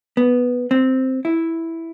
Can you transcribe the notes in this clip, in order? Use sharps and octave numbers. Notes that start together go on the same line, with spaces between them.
B3
C4
E4